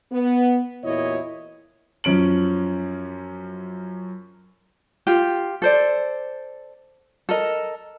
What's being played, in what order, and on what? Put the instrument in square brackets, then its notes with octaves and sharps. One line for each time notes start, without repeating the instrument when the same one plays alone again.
[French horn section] B3
E2 A#2 E4 F#4 C#5 D#5
[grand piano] F#2 F3 C#4 D7 F#7
[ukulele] F4 G4
A4 C5 D5
A4 A#4 D#5